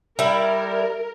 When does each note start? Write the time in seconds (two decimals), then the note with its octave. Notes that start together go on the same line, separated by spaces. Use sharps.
0.19 G3 E4 A#4